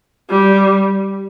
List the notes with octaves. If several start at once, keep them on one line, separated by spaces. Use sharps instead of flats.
G3